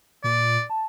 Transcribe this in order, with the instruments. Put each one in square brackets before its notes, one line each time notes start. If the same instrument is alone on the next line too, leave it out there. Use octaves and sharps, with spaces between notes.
[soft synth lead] A#2 [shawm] D5
[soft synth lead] A5